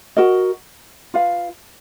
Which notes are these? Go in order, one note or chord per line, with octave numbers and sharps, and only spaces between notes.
F#4 A#4 D#5
F4 B4 F5